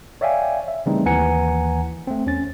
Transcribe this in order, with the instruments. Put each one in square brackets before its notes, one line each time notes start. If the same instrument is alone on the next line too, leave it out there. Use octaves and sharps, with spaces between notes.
[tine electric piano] C#5 D5 E5 F5 G5 G#5
E5
C#3 E3 G3 A3 C4 D#4
D#2 E3 F#5 G#5 A#5 C#7
A3 C4
E2 C#4 A6